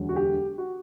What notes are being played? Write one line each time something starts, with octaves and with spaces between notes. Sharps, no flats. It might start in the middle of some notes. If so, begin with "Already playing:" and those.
Already playing: E1 D2 D3 F#3
F#4
G4
F#4